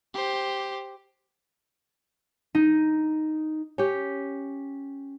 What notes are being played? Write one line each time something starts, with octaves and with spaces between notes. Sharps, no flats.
G4 C5
D#4
C#4 G4